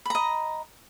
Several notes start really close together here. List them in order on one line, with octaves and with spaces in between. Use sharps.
B5 A#5 D#5